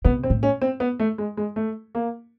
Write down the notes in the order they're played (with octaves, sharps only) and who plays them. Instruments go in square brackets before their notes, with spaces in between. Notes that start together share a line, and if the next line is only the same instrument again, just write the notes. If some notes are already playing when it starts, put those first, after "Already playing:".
[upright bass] C3 [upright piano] B3
[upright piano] C4
[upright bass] A2
[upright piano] C#4
C4
B3
A3
G#3
G#3
A3
A#3